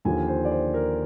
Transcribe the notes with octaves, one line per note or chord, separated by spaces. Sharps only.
D#2 D3 F3 G#5
C5
D5
C5
A#4